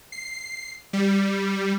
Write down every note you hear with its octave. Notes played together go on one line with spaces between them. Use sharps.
C7
G3